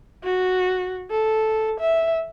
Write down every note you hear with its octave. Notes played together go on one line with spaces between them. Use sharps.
F#4
A4
E5